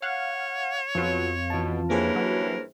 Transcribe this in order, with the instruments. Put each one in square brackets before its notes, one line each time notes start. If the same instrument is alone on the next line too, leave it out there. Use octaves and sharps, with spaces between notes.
[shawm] C#5 [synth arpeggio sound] F5 F#5
[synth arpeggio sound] F2 F4 [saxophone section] B2 F#3
[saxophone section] B2 [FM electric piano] E3 A5
[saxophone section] G2 E3 C#4 [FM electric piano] A#3 G#4 C5 [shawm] A#4
[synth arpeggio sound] F#3